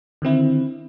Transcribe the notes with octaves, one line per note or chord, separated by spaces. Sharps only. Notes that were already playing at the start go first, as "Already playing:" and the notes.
D3 D#3 C4 E4